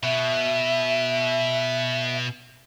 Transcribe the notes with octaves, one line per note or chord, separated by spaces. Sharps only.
B2 E5